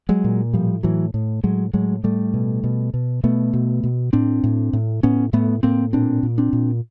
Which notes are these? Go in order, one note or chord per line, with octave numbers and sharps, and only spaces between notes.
F#3 G#3
A#2
A2 F3 G3
A2 E3 F#3
A2
A2 F#3 G#3
A2 F#3 G#3
A2 G3 A3
B2
B2
B2
B2 A3 B3
B2
B2
A2 C4 D4
A2
A2
A2 B3 C#4
A2 A3 B3
A2 A#3 C4
A#2 C4 D4
A#2
C4 D4
A#2